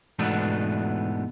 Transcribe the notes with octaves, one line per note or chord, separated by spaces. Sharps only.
E2 G#2 B2 A3 B3 D4